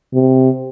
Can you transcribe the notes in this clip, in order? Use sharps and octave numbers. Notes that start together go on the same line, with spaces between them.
C3